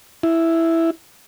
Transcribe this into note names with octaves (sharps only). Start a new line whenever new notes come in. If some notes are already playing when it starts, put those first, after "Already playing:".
E4